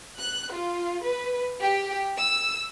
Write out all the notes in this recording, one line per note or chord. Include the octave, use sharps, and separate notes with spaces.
F#6
F4
B4
G4
E6